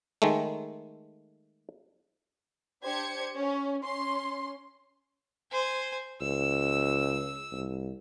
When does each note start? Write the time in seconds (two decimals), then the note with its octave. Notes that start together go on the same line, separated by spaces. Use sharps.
0.22 D#3 G#3 A3
2.81 D4 G4 C5 G#6 C#7
3.37 C#4
3.83 C#4 C6
5.51 C5 G#5
6.21 C#2 E6
7.52 C2